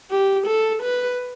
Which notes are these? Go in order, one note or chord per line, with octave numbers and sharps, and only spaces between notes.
G4
A4
B4